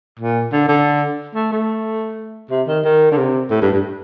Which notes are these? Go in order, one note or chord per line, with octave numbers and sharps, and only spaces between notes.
A#2
D3
D3
A3
A3
C3
D#3
D#3
D3
C3
A2
G2
G2